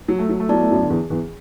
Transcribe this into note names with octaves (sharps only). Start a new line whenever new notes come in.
F#3
A3
F#3
A3
F#3 B3 E4 D5 A5
A3
F#2 F#3
D3
E2 E3
E2 E3